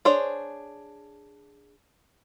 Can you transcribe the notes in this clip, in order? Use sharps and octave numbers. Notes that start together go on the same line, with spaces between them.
D4 G#4 C5 C#5